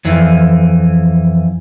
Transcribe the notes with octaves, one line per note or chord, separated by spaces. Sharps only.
F2 E3